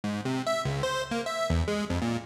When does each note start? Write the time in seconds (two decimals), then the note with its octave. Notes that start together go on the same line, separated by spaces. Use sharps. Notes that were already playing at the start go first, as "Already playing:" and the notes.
0.04 G#2
0.25 C3
0.47 E5
0.65 C#2
0.83 C5
1.11 A#3
1.26 E5
1.50 E2
1.68 G#3
1.90 F2
2.02 A#2